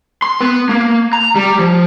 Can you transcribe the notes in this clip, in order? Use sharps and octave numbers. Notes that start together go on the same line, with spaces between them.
C6
B3
A#3
A#5
G3
F3